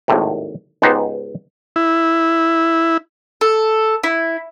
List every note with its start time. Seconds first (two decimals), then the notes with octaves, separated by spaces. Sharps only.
0.08 G#1 D#2 A2 C3
0.82 C#2 G#2 B3 D#4 G4 C5
1.76 E4
3.41 A4
4.03 E4